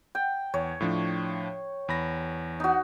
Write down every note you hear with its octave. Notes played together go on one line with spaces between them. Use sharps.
G5
E2 C#5
A2 F3 D4
E2 B5 A#6
D#4 F#4